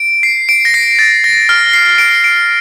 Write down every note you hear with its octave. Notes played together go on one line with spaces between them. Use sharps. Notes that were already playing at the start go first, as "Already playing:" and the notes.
Already playing: D7
C7
D7
A#6
C7
A6
A#6
F6
C7
D7
D7